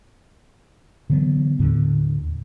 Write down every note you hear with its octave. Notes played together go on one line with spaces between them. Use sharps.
D3 E3 F#3 B3
D#2 A2 D3